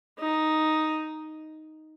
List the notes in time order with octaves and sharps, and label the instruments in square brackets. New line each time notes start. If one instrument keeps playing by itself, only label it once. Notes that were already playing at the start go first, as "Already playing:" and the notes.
[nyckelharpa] D#4